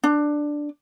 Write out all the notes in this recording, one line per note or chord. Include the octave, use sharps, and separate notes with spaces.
D4